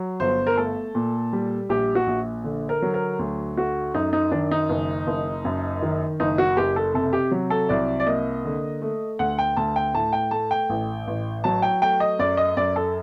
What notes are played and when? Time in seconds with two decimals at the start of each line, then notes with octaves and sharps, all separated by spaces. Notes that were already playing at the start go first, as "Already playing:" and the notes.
Already playing: F#3
0.20 G1 C5
0.47 A#4
0.58 A3 A4
0.95 A#2
1.33 G3
1.69 A#1 G4
1.95 F#4
2.07 A#1
2.44 D3
2.69 A#4
2.82 F#3
2.94 A#4
3.19 D2
3.57 A3 F#4
3.94 F#2 D#4
4.13 D#4
4.32 D#3 D4
4.51 D#4
4.69 F#1
5.07 F#1
5.45 F#2
5.82 D#3
6.20 F#1 D#4
6.38 F#4
6.57 F#1 G4
6.76 A4
6.94 C3 A4
7.13 G4
7.31 F#3
7.50 A4
7.69 C2 D5
8.00 D5
8.06 A#3 D#5
8.45 D3
8.82 A3
9.19 D2 F#5
9.39 G5
9.57 D2 A5
9.76 G5
9.94 A2 A5
10.13 G5
10.31 A3 A5
10.51 G5
10.70 A1
11.07 A1
11.44 F#3 A5
11.62 G5
11.82 A3 G5
12.00 D#5
12.19 F#2 D5
12.37 D#5
12.57 F#2 D5
12.76 A4